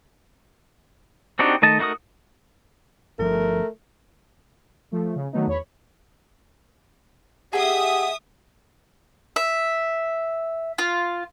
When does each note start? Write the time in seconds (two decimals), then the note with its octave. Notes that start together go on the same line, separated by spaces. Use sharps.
1.39 C4 D4 D#4 F#4 G4
1.62 D#3 A3 D#5 A5
1.79 A3 D#4 F#4 A#4 D#6
3.19 G1 F3 A3 A#4
4.92 F3 A3
5.16 C#3
5.32 D#3 F#3 A3 B3 D#4
5.47 E2 C#5 B5
7.53 G4 G#4 D#5 E5 F#5 D#6
9.36 E5
10.78 F4